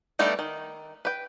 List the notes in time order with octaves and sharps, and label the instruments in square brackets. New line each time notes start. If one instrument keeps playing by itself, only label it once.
[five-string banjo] G3 A3 B3 D4 D#4
D#3
B4 G5